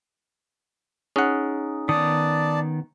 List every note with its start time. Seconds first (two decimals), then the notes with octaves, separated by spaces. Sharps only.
1.16 C#4 D#4 G#4 F#5
1.89 D#3 B3 D5 A5 D#6